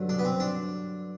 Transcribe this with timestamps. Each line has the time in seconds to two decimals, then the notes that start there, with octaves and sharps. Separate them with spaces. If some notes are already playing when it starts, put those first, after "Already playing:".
Already playing: G2 D3 F#3
0.09 D4
0.19 B3
0.25 C4
0.40 D4